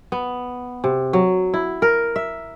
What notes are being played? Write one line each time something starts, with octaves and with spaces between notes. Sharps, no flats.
B3
C3
F#3
E4
A#4
E5